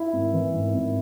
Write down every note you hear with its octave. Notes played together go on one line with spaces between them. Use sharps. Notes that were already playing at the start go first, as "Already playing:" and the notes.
Already playing: E4
G#1
E3
G#1
G#1